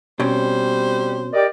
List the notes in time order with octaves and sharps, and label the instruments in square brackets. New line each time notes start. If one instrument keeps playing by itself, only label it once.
[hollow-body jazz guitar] B2 C4 C#4 [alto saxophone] G3 [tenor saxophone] C5
[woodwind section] G4 A#4 D5 [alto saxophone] D#5